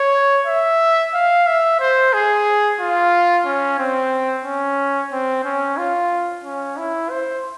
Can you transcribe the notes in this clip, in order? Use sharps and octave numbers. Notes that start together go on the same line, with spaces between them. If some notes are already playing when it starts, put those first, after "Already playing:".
Already playing: C#5
E5
F5
E5
C5
G#4
F4
C#4
C4
C#4
C4
C#4
F4
C#4
E4
C5